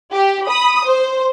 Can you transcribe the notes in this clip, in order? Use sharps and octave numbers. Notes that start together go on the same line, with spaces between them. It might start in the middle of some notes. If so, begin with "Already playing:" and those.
G4
B5 D#6
C5